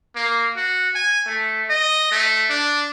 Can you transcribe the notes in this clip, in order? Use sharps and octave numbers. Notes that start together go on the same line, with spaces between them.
A#3
F#4
G#5
A3
D#5
A3
D4